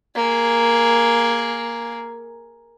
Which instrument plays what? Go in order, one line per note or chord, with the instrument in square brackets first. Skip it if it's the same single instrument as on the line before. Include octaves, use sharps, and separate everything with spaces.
[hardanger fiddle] A#3 G#4